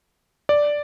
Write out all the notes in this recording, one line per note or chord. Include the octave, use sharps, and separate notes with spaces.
D5